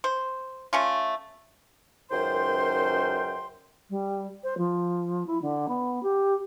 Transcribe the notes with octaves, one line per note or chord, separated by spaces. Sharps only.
C5
A3 C#4 F4
C#2 F#2 D#3 C5 G5 C6
G3
C5
F3
E4
D3
B3
G4